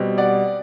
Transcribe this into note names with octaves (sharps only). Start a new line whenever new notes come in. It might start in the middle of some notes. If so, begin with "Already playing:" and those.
Already playing: B2 G3 C4
D5 F#5